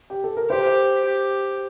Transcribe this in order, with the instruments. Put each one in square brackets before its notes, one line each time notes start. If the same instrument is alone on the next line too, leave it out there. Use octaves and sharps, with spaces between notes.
[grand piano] G4
A4
A#4
[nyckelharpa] G4 [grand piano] C5
[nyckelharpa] G4